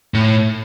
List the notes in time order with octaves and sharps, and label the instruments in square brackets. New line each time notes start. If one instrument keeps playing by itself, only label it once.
[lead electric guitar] A2